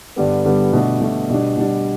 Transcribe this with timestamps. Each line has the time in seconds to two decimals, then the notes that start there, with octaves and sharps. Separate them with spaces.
0.16 G2 D3 G3 B3
0.45 G2 D3 G3 B3
0.73 B2 A3 D4
1.01 B2 A3 D4
1.30 B2 G3 D4
1.57 B2 G3 D4